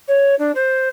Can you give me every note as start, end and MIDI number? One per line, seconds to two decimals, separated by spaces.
0.08 0.35 73
0.39 0.52 62
0.55 0.88 72